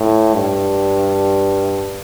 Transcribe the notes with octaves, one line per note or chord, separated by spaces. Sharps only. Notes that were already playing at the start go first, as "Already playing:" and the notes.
Already playing: A2
G2